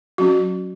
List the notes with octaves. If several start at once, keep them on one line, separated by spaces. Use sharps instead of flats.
F#3 C#4 F#4